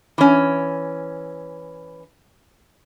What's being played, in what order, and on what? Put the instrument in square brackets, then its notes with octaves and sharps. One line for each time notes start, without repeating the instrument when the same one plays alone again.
[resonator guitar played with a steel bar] E3 C#4